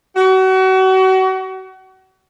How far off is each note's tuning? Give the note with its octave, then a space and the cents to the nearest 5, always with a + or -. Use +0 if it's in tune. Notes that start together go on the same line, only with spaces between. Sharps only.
F#4 +35